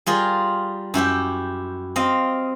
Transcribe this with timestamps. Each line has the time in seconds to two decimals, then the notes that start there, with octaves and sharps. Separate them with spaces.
0.06 G3 F4 G#4 A#4
0.94 F#2 E4 G4 G5
1.96 C4 D#5 F5